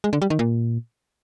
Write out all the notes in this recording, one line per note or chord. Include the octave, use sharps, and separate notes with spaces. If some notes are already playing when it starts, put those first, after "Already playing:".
G#3
D3
G3
D#3
A#2